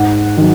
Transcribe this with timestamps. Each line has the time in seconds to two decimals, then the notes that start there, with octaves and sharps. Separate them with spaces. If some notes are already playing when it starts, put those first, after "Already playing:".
Already playing: G#2 F#5
0.37 D#3 F#3